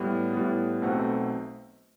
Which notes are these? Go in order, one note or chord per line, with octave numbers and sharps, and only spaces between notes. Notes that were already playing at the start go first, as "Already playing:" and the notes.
Already playing: A2 G3 B3
A2 G3 B3
B1 B2 A3 C4 F#5